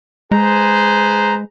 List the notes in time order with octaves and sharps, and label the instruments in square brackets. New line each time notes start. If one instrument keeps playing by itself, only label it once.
[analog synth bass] G#3 [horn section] G#4 B4 C5 [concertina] A#5